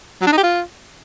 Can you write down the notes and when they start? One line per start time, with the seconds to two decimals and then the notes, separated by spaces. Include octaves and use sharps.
0.21 F#3
0.27 D4
0.32 D#4
0.38 G4
0.43 F4